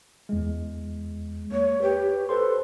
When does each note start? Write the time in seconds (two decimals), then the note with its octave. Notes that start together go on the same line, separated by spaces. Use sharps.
0.29 E2 G#3
1.52 A#3 C#5
1.82 G4 B4
2.29 A4 B4 C5 C6